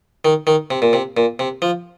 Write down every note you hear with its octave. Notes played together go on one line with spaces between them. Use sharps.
D#3
D#3
C3
A#2
C3
A#2
C3
F3